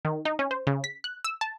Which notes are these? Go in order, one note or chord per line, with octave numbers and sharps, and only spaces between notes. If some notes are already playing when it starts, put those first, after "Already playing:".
D#3
D#4
C#4
C5
C#3
B6
F#6
E6
A5